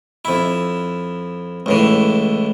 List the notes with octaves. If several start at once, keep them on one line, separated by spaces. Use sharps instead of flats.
F2 E4
C#2 A2 E3